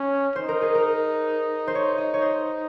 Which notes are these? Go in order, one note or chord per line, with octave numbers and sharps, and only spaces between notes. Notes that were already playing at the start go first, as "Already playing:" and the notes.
Already playing: C#4 C#5
D#4 C5
A#4
G#4
A#4
C5
C#5
D#5
C#5
C5